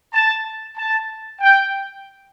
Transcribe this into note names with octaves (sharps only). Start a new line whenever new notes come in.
A5
A5
G5